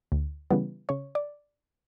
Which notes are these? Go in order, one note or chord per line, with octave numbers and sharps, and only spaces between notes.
D2
C#3 E3 G3 B3
C#3 C#5
D5